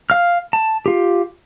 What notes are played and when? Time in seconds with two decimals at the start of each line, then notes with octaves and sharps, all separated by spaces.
0.10 F5 F6
0.53 A5
0.86 F4 G4